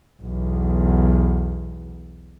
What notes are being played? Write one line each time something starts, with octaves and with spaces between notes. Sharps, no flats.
B1 E2